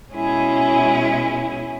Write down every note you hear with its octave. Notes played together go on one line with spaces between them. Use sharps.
B2 G#3 C#4 E4 G#4